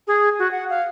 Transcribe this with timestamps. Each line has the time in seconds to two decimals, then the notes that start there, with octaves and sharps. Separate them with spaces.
0.07 G#4
0.39 F#4
0.51 F#5
0.70 F5